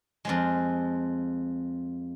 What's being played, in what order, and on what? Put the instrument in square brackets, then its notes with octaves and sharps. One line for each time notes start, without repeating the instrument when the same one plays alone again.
[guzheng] F2 F3 G#3